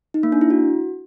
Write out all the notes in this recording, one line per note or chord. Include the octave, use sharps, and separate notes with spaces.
D#4
A#3
D4
E4
F#4